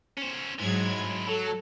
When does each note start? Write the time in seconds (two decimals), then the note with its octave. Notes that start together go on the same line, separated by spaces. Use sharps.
0.17 C#4 C5
0.59 G#2 F#3 G#3 E4 G#6
1.28 F#3 A4